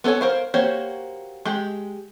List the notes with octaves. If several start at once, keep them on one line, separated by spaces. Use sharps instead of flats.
B3 A4 A#4 C#5 G#5
A#4 C5 F5
A#3 F#4 G4 C5 C#5
G#3 G4